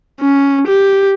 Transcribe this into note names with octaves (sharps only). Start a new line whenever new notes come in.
C#4
G4